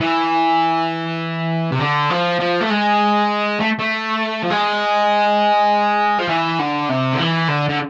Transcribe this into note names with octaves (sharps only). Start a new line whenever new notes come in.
E3
C3
D3
F3
F3
A3
G#3
A3
A3
F3
G#3
F3
E3
D3
C3
D3
E3
D3
D3